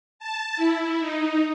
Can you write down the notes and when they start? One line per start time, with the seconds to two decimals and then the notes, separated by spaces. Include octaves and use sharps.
0.19 A5
0.56 E4
1.00 D#4